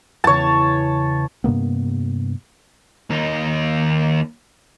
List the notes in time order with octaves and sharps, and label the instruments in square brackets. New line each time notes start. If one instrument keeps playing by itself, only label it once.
[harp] E2 C#3 [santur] C#5 A5
[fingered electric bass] G2 C3 A#3 B3
[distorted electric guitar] D#2 D#4